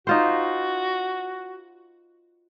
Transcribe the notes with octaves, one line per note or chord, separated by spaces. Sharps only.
D#4 F4 F#4 C5